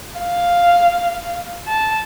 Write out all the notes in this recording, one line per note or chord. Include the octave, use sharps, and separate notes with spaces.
F5
A5